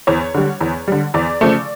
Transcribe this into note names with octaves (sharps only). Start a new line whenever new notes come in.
E2 C#5
D3 G3
E2
D3 G3
E2 D5
C#3 F3 A3